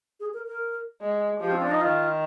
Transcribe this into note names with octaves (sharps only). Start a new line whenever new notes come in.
G#4
A#4
A#4
G#3
F3 G4
C4
D4
D#4
D#3 F4